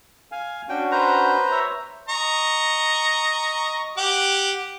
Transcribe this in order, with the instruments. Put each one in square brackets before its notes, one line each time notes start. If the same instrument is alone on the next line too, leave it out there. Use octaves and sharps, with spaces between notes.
[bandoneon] F5 G#5
[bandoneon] C#4 D4 F#4 [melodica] G5
[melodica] B4 C5 A#5
[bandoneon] C#5 E5
[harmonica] D#5 A#5 C#6
G4 F#5 D6